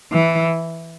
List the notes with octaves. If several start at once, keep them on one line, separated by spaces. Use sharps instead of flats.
E3